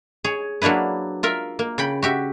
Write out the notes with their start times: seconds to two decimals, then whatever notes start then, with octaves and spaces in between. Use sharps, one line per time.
0.24 G#4 C#5
0.62 F#3 A#3 D4 E4 B4
1.23 F4 A#4 E5
1.59 A#3
1.78 C#3 G5 B5
2.02 F#4 G4 E5